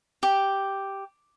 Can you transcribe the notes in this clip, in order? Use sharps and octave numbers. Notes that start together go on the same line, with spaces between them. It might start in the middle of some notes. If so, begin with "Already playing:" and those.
G4